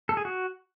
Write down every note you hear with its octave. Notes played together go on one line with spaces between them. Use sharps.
A4
G#4
F#4